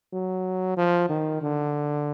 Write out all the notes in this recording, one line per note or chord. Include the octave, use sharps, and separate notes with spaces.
F#3
F3
D#3
D3